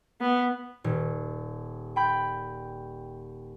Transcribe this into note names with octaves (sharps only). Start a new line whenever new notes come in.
B3
D#1
G5 B5 G6